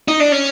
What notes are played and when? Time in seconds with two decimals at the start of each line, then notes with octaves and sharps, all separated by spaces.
0.08 D#4
0.20 D4
0.32 C#4